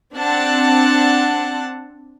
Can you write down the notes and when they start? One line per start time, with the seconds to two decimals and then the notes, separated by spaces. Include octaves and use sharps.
0.15 C4 D4 F#5 A5